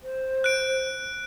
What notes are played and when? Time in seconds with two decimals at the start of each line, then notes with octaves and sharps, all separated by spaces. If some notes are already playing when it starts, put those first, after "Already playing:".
0.03 C5
0.44 F#6 D7